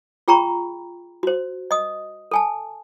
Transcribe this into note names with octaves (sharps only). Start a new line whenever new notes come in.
F4 G#4 G5 A#5 B5 C#6
F#4 C5
D#5 D#6
A4 G#5 A5